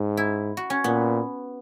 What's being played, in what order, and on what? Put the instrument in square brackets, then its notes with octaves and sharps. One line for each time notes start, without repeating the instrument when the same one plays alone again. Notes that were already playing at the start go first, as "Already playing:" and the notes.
Already playing: [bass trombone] G#2
[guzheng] E4
F#4
C#4
[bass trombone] A#2 [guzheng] B3